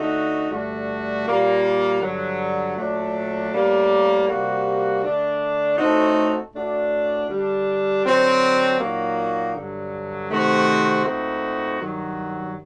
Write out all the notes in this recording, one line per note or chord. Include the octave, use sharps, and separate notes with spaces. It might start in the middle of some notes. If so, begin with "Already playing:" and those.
Already playing: D3 A3 D#4 F#4
G2 D3 A3 D4 F#4
A#2 G3 A#3
G2 D3 F#3
A#2 F#3 A3 D4 F#4
A2 G3 A#3
C3 G3 A#3 F#4
D3 A3 D4
A2 A3 C4 D#4 F#4
A2 A3 D4 F#4
D3 G3 D4
D3 F#3 C4 F#4
A#2 F#3 A#3 D#4 F#4
G2 D3 F#3
C3 D#3 A3 C4 F#4
A#2 A3 C4 D#4 F#4
G2 D#3 F#3